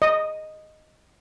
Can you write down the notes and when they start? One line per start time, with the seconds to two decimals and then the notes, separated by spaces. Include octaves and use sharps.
0.02 D#5